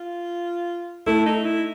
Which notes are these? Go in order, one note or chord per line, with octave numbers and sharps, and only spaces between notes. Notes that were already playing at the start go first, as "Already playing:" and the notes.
Already playing: F4
A3 E4
D#4
E4